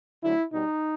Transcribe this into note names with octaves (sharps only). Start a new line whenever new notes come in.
D3 F#3 A3 E4
B2 G3 D#4